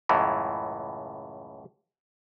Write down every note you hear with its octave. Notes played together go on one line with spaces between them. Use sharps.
C#2 F#2 A2 E3